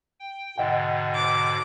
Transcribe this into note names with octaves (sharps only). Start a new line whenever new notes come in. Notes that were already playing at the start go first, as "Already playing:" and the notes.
G5
G#2 B2 D3 D#5 F#5 G5
D6